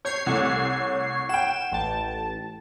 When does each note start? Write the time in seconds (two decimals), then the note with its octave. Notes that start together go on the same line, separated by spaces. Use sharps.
0.05 C#5 G6 G#6 C7
0.26 C2 A3
1.29 F#5 G5 E7
1.72 A1 A5